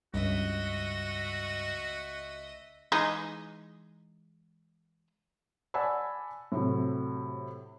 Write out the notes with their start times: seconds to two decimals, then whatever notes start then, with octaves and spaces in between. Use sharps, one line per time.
0.14 C#2 G2 F#4 D#5 E5
2.92 E3 G#3 D#4
5.74 D5 F#5 G#5 A5 B5 E6
6.52 A2 C3 F#3